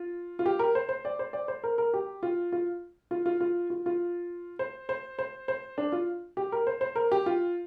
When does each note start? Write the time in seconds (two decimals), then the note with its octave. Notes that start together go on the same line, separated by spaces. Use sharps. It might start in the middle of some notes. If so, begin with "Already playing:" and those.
Already playing: F4
0.39 F4
0.46 G4
0.59 A#4
0.75 C5
0.89 C5
1.05 D5
1.19 C5
1.33 D5
1.48 C5
1.64 A#4
1.78 A#4
1.94 G4
2.23 F4
2.52 F4
3.11 F4
3.26 F4
3.41 F4
3.70 F4
3.86 F4
4.59 C5
4.89 C5
5.19 C5
5.48 C5
5.78 D4
5.92 F4
6.37 G4
6.52 A#4
6.67 C5
6.81 C5
6.96 A#4
7.12 G4
7.26 F4